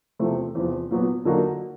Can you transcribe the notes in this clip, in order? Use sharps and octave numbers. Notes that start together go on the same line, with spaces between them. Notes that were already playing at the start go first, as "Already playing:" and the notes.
E2 C3 F3 A3
E2 C3 F3
A#2 F#3 B3
D3 F#3 A#3 D#4 F#4